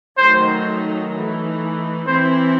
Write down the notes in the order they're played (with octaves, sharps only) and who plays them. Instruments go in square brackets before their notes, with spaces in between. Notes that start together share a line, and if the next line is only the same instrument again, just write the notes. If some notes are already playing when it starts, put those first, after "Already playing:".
[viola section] D#3 F#3 A3 D#4 [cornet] C5
[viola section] E3 A3 D#4
[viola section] E3 C4 E4 [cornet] C5